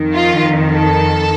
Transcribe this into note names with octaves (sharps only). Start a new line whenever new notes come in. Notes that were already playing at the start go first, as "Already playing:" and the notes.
Already playing: F2 D#3
F4
A4